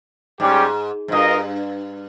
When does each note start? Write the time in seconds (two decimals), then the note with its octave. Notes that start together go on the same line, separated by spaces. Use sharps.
0.40 G#2 G3 C#4 G4
1.08 G#2
1.12 G2 F4 A#4 D#5